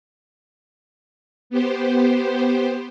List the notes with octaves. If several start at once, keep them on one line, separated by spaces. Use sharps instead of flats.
B3 G4 C5